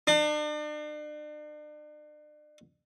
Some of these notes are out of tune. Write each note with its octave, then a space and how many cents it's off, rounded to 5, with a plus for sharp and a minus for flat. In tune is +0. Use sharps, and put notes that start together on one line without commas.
D4 +40